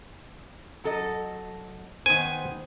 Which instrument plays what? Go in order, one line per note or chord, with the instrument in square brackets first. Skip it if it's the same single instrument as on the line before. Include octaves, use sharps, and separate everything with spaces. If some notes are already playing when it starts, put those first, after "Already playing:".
[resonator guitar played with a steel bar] F#3 A4 D#5
[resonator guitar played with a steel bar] D#3 B3 C5 [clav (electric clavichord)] G#5